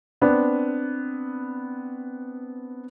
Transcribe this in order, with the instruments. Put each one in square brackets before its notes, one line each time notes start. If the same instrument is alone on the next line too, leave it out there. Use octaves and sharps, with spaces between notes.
[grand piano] B3 C4 D4